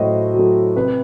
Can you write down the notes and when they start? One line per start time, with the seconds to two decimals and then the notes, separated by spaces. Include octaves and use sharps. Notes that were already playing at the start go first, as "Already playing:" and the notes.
Already playing: A2 F#3 A3 E4 F#4 C5 D#5
0.34 F#3
0.39 A3
0.76 C3 B4